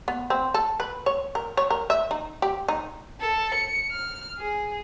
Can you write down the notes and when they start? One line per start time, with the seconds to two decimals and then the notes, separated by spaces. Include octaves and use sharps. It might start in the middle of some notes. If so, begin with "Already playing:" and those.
0.08 B3
0.30 C4
0.54 A4
0.80 B4
1.06 C#5
1.35 A#4
1.57 C#5
1.70 A#4
1.90 E5
2.11 D#4
2.42 G4
2.68 D#4
3.21 A4
3.55 C#7
3.92 F6
4.38 G#4